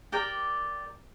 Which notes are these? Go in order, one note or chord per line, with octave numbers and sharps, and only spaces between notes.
G4 A#4 D5 G5